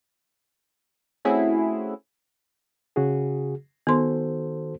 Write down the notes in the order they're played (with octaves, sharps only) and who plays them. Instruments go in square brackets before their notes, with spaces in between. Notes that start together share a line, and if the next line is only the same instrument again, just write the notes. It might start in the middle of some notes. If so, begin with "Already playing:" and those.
[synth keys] A3 C4 C#4 E4 F#4 G#4
[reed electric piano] C#3 F#4 G#4
[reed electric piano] D#3 [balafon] B3 C6 [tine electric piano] F#4 A4 C5